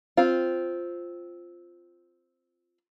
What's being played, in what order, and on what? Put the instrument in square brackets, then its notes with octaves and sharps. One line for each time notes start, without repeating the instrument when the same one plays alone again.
[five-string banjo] C4 F4